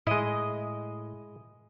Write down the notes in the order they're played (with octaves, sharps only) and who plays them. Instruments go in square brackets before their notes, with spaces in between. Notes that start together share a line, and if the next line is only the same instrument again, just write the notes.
[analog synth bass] A2 [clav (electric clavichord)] G#3 E4 [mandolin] D#5